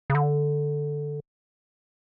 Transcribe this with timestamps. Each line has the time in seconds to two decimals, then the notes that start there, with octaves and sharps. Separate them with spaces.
0.10 C#3
0.15 D3